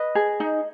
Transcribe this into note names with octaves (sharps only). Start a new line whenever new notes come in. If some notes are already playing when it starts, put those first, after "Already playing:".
Already playing: B4 D#5
G#4
D#4